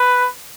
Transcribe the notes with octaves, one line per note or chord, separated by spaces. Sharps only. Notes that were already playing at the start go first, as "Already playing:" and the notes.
Already playing: B4